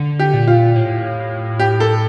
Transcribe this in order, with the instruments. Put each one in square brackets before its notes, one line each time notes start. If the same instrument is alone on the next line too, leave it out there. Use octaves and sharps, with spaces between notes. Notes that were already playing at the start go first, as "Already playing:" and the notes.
Already playing: [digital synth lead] D3
[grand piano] G4
[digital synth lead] A#2
[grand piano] F4
[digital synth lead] A2
[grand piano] G4
A4